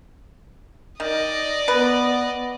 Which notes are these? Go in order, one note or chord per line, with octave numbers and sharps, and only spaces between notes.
D#3 D5 D#5
B3 B4